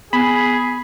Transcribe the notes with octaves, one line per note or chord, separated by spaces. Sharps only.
B3 G#4 B5